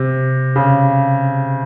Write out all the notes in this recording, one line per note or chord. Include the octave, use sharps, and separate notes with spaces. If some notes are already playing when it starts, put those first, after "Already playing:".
Already playing: C3
C#3